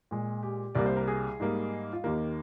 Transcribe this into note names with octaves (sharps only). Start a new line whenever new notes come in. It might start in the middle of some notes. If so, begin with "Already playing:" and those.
A#2 G#3
G4
C2 C3 G3 A#3 D5
C5
A#4
G#4
G#2 G3 A#3
F4
D#2 D#3 A#3 G4